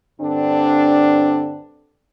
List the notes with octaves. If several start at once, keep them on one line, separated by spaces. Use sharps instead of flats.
G2 D3 C4 D4